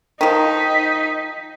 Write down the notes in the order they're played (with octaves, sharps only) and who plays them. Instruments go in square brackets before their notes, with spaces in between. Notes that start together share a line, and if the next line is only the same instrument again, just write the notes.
[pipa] D#3 F3 [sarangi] D#4 [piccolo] B6